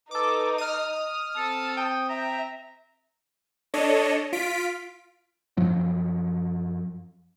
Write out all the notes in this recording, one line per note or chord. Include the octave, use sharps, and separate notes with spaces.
D#4 A4 B4 D6
D#5 D#6 F6
C4 A4 A5
G5 D#6
E5 A#5
D4 A4 C#5 D#5
F4 B6 D7
F#2 F3 F#3